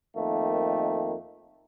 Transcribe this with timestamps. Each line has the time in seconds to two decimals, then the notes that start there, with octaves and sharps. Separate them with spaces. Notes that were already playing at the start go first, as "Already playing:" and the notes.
0.17 F2 D#3 A3 A#3